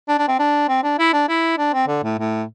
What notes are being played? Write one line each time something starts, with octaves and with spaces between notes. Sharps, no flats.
D4
D4
C4
D4
C4
D4
E4
D4
E4
D4
C4
D3
A2
A2